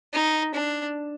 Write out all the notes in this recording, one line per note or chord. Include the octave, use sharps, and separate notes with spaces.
D#4
D4